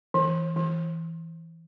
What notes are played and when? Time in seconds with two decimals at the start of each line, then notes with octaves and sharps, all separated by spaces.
0.14 E3
0.56 E3